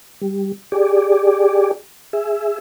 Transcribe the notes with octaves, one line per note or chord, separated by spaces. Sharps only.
G3
G4 G#4 D5
G#4 E5